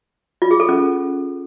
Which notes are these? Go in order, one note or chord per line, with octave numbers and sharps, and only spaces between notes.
F4
G#4
A4
C#4